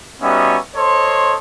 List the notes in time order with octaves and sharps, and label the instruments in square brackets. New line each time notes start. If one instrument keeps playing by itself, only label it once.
[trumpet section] G3 B3 C#4 D#4 F#4 E5
A4 C5 C#5 D#5 C6